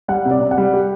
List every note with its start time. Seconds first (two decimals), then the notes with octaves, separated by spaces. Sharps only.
0.08 G3 F#5
0.25 C3
0.31 D5
0.41 C3
0.51 F#5
0.58 G3
0.73 G4